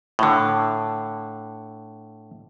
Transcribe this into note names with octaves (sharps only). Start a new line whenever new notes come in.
A2 D3